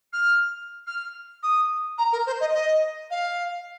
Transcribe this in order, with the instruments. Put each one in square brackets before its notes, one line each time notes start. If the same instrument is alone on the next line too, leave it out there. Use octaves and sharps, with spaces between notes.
[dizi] F6
F6
D#6
A#5
A#4
C5
D#5
D#5
F5